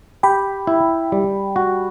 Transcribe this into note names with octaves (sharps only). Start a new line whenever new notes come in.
G4 G5 B5
E4
G3
F#4